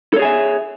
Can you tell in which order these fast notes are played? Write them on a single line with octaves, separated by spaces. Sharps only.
A4 C#5 G#4 G#5 E5